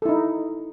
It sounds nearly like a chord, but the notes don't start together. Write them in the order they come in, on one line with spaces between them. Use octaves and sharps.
A4 E4 D#4